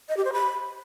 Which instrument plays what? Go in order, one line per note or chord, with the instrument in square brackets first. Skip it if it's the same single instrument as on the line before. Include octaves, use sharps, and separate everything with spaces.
[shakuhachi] D#5
G4
C5
B5